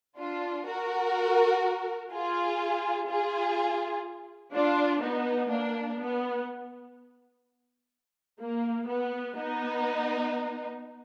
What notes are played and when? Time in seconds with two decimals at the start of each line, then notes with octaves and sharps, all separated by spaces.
0.18 D4 F4
0.67 F#4 A#4
2.12 F4 G#4
3.08 F4 G#4
4.53 D4 F4
5.01 B3 D#4
5.49 A#3 D4
5.98 B3
8.39 A#3
8.87 B3
9.36 B3 D#4